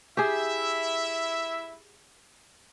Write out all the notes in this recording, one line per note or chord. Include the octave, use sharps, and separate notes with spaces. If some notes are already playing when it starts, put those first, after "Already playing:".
E4 G4 G#4 E5